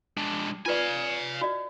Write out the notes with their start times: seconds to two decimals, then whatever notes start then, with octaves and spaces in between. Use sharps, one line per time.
0.17 G#3 D4
0.66 F4 B4 D5 F5 G#5
1.41 F#4 D5 D#5